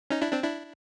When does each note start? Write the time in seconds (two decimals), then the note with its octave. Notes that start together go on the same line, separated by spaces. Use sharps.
0.11 C#4 D#4
0.22 D4 E4
0.32 C4 D4
0.43 D4 E4